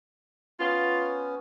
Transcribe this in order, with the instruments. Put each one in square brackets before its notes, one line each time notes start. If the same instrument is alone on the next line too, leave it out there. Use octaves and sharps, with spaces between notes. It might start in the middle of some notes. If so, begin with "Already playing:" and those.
[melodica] B3 C#4 [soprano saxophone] F4